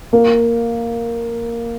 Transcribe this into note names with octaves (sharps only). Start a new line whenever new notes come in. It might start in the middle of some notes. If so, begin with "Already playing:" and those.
A#3